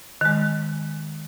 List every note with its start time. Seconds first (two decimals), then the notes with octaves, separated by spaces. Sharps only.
0.21 D#3 G#3